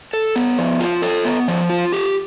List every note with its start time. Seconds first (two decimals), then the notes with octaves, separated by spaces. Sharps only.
0.13 A4
0.36 B3
0.59 F3
0.80 F4
1.02 A4
1.25 B3
1.48 F3
1.69 F4
1.92 G4